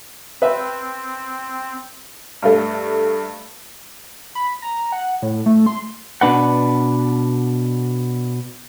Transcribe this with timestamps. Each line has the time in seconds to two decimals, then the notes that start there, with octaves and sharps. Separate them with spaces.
0.42 C4 B4 E5
2.43 G2 A3
4.35 B5
4.62 A#5
4.92 F#5
5.22 A2
5.46 A3
5.66 C6
6.21 B2 D4 B4 F#5